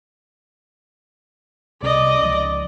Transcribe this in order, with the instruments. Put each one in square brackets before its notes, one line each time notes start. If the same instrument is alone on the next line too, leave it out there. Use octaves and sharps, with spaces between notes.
[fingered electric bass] C2 C3 C#4 [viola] D5 D#5
[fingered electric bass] C#2 F3